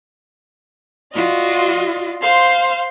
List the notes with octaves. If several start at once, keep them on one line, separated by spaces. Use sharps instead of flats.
F4 F#4 D5 D#5
C5 F5 C6